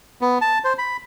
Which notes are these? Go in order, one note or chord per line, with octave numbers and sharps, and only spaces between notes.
B3
A5
C5
B5